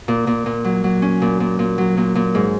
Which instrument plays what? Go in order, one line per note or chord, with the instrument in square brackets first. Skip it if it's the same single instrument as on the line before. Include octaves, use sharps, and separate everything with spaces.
[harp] A#2
A#2
A#2
F#3
F#3
C#4
A#2
A#2
A#2
F#3
A#2
A#2
G#2